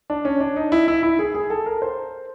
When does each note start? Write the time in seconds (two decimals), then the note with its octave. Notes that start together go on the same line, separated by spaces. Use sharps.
0.10 D4
0.25 C#4
0.40 D4
0.56 D#4
0.72 E4
0.88 E4
1.03 E4
1.19 G#4
1.35 G#4
1.50 A4
1.66 A#4
1.82 C5